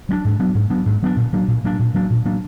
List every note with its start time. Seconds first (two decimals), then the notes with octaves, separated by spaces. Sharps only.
0.09 F#3 B3 D4
0.25 G#2
0.39 F#3 B3 D4
0.55 G#2
0.70 F#3 B3 D4
0.86 G#2
1.02 F#3 B3 D4
1.16 A#2
1.33 F#3 A#3 D4
1.48 A#2
1.64 F#3 A#3 D4
1.79 A#2
1.94 F#3 A#3 D4
2.10 A#2
2.25 F#3 A#3 D4